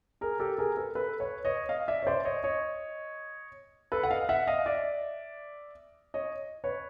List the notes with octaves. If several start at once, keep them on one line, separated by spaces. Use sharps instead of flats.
G#4 A#4
G4 A4
G#4 A#4
A4 B4
A4 B4
B4 C#5
C#5 D#5
D#5 F5
D5 E5
C#5
C5 D5
C#5 D#5
C#5 D#5
A4 B4
F#5
D#5 F5
E5 F#5
D#5 F5
D5 E5
C#5 D#5
B4 C#5